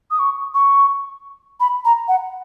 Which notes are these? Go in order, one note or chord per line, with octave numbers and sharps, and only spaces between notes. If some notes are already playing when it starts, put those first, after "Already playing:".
D#6
C#6
C#6
B5
A#5
F#5